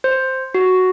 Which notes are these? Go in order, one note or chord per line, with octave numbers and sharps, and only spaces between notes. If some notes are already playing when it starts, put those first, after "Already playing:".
C5
F#4